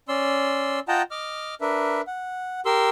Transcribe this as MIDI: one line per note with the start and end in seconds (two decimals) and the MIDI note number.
0.09 0.80 61
0.09 0.80 74
0.09 0.80 84
0.09 0.80 88
0.88 1.02 65
0.88 1.02 75
0.88 1.02 78
0.88 1.02 79
0.88 1.02 81
0.88 1.02 82
1.11 1.55 75
1.11 1.55 86
1.11 1.55 89
1.61 2.01 62
1.61 2.01 70
1.61 2.01 71
1.61 2.01 76
2.07 2.60 78
2.66 2.90 67
2.66 2.90 70
2.66 2.90 84
2.66 2.90 88